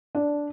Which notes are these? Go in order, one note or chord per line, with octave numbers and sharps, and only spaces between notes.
D4